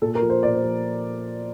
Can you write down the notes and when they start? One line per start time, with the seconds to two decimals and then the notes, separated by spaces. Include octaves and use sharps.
0.02 A#2 A4
0.15 A#4
0.22 F3
0.30 C5
0.43 A#2 D5
0.54 C5
0.63 F3